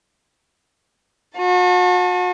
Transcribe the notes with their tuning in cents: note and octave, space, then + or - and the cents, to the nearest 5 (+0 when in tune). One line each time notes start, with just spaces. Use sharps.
F#4 -40 A5 +0